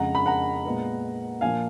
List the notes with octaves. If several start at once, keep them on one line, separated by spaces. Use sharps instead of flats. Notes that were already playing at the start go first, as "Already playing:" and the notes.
Already playing: F2 C#3 G#3 F#5 A#5
B5
F#5 A#5
A#2 G#3 B3
A#2 F3 A#3 F5 G#5